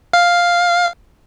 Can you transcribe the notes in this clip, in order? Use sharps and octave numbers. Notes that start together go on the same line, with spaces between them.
F5